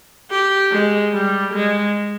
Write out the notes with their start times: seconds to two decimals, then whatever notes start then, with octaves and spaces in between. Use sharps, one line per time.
0.30 G4
0.71 G#3
1.13 G3
1.54 G#3